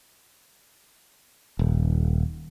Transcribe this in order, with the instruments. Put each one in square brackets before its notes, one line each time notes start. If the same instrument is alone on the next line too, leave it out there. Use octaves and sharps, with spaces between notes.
[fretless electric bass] D#1